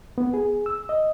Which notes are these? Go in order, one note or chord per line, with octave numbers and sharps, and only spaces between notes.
B3
G#4
E6
D#5